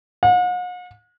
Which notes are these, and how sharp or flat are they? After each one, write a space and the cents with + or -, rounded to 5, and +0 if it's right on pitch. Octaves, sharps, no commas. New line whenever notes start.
F#5 -45